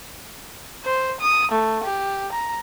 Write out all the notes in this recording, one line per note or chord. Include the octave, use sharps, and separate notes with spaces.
C5
D#6
A3
G4
A#5